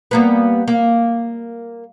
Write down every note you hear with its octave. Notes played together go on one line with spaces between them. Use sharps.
G3 A#3 B3
A#3